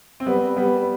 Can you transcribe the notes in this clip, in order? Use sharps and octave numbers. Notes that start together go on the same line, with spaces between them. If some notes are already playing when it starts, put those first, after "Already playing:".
C4
G3 B3
G3 B3